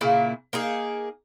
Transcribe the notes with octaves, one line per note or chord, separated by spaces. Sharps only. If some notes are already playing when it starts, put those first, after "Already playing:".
A#2 C#3 A#3 E4
A#3 D#4 G#4